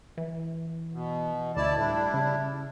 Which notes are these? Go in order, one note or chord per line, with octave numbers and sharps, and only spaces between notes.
E3
B2
D2 E4 D5 A5
A2 G3 D4 E4
C#3